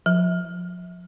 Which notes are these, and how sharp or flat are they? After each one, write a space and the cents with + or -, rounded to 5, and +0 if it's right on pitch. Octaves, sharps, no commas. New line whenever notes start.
F3 +35